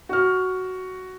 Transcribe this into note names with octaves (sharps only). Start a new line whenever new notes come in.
F#4 F6